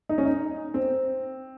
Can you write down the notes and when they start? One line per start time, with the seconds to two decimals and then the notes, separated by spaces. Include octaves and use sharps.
0.09 D#4
0.18 C#4
0.25 D#4
0.74 C4